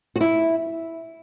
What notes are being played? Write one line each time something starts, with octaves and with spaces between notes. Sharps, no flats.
F#4
E4